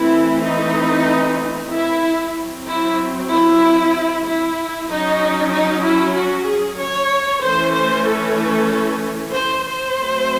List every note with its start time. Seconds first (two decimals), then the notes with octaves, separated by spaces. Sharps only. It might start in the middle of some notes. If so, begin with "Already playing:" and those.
Already playing: E3 A3 C4 E4
0.45 D#4
1.72 E4
2.35 F#3 C4
2.67 E4
3.31 E4
4.25 E4
4.88 F#3 C#4 D#4
5.52 D#4
5.84 E4
6.16 F#4
6.47 G#4
6.79 C#5
7.42 E3 A3 C#4 C5
7.74 C5
8.06 A4
9.33 C5
9.64 C5
9.95 F#3 A3 C4